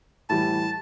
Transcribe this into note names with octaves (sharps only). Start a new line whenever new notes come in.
A2 E3 G3 A5